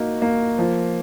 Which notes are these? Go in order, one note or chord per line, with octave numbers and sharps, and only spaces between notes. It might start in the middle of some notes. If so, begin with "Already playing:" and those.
Already playing: A#3 D#4 F#4
A#3
F3